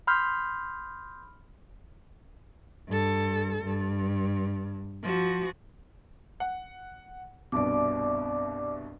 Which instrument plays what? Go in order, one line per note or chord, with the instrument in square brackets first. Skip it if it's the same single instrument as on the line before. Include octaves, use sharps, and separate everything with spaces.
[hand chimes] B5 C6 D#6 F6 G6
[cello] G2 A4
G2
F3 F#4
[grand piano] F#5
[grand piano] C2 G2 B2 [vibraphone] D5 D6